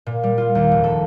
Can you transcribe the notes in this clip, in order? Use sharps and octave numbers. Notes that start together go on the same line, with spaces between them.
A#2
G3
F4
D#2
F1
A4